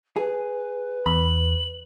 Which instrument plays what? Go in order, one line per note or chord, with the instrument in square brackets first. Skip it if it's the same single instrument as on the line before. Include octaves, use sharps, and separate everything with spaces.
[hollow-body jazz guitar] G#4 [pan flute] B4
[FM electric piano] E2 [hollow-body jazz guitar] B5 [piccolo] F#7